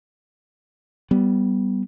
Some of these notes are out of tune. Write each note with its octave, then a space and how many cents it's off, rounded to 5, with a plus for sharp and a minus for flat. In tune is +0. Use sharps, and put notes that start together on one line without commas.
G3 -10 B3 +0